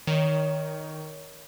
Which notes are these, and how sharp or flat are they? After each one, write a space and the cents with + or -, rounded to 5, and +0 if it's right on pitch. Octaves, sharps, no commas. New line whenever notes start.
D#3 +0 C#5 +20